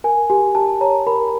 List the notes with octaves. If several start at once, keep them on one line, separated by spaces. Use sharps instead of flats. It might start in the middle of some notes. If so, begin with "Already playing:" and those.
A#4 G#5
G4 G#5
G4 A5
C#5 A#5
A#4 B5